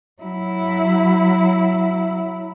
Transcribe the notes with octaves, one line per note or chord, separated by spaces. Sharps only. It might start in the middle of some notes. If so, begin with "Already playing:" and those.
F#3 E4